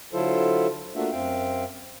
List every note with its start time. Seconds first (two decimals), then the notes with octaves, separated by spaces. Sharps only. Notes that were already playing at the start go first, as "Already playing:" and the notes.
0.13 D3 F#3 E4 F4 A4 C5
0.95 A3 A#3 D4 F4 F#4 E5
1.12 F#2 C4 E5 F5 G5